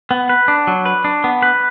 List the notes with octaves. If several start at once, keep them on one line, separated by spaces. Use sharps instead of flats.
B3
B4
D4
F#3
B4
D4
B3
B4